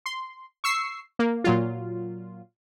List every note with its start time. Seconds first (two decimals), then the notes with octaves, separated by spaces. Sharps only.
0.06 C6
0.64 C#6 E6 C7
1.19 A#3
1.44 A#2 F#3 F4